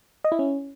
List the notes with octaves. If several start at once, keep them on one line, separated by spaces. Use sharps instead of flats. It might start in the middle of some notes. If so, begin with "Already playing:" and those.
D#5
E4
C#4